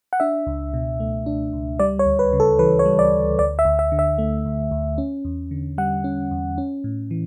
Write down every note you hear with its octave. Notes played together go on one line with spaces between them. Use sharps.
F#5
D4 E5
C#2
B2
A3
D4
C#2
G3 D5
C#5
D2
B4
C#3
A4
E3 B4
C#5
G3
D5
D2
D2 D5
E5
D2
E5
D3
E5
A3
D2
D2
C#4
E2
D3
G3 F#5
C#4
E2
C#4
A2
E3